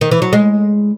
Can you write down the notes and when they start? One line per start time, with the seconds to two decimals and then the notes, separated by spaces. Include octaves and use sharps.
0.01 D#3
0.11 E3
0.22 F#3
0.33 G#3